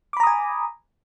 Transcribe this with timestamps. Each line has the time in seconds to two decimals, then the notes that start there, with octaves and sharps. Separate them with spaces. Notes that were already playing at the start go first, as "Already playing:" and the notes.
0.13 D6
0.17 B5
0.20 A#5
0.23 D#6
0.27 G#5